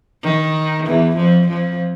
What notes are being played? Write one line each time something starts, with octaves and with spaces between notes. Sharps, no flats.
D#3
E2 E3
F2 F3
F2 F3